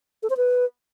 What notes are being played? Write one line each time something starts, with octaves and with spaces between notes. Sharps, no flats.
A4
C5
B4